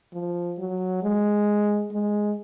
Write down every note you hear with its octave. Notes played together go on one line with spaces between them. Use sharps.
F3
F#3
G#3
G#3